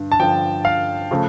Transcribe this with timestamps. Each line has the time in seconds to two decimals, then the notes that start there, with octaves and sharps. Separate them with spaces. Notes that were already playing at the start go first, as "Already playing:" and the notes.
Already playing: G2 D3
0.12 A5
0.20 G2 D3 F3 G5
0.65 F5
1.11 C#3 F3 A3